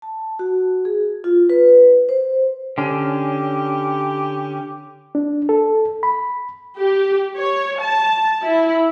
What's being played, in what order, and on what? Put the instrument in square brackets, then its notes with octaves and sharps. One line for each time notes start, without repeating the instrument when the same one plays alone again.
[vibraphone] A5
F#4
G#4
F4
B4
C5
[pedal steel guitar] D3 C#4 [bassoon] G4
[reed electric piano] D4
A4
B5
[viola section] G4
C#5
A5
E4